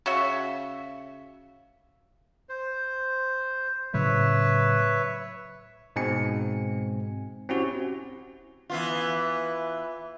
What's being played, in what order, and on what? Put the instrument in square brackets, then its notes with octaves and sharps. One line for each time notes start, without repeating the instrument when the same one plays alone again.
[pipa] C#3 F#4 E5
[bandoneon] C5
[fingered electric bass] A2 C#3 F#3 [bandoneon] B4 C#5 E5
[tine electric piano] G#2 B2 G#3 C4 G#5 C#7
C4 C#4 E4 F#4 G4
[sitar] E3 B3 F4